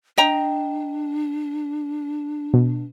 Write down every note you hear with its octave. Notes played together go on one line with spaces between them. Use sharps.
D4 D#5 G5 A#5
B2